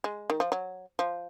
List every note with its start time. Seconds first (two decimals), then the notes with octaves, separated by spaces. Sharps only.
0.04 G#3
0.30 D#3
0.40 F3
0.52 F#3
0.99 F3